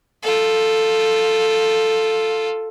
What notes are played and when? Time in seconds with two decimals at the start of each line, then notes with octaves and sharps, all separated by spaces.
0.22 F4 A4